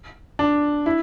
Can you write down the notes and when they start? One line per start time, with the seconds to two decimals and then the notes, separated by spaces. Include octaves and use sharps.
0.39 D4
0.86 E4